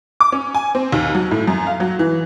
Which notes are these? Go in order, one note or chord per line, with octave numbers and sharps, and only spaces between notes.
D6
C#4
G#5
C4
D#2
F#3
A2
F#2
F5
F#3
E3